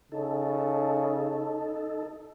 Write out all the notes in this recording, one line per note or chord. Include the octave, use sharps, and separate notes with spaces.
C#3 D#4 A4